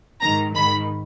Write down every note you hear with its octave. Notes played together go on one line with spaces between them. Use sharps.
G#2 D#3 A#5
G#2 D#3 B5